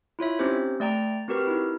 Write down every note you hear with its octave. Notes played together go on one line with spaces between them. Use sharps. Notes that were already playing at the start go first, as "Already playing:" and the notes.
E4 F4 C#5 E5
C4 C#4 D#4 G4 C5
A3 D5 G5 A#5
C4 F#4 G4 A#4 B4 F6
D#4 E4